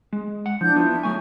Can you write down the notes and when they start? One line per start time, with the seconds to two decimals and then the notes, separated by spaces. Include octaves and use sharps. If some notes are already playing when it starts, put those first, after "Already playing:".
0.13 G#3
0.46 F#5
0.61 F3 D4 E4 G6
0.76 B3 E4 F4 A5
1.03 F#3 A3 G#5 C#6